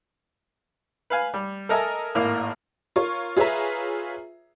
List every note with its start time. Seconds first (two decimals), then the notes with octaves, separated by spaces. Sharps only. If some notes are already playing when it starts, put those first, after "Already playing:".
1.10 B4 F5 G#5
1.34 G3
1.69 A4 A#4 D#5 E5 G#5 A5
2.15 G#1 A2 A#3 A#4
2.96 F4 A#4 C#5 C#6
3.37 F4 G#4 B4 C#5 E5 A#5